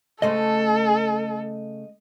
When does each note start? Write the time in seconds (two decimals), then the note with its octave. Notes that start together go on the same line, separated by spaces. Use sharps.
0.22 C#3 A3 A4 C5 D#5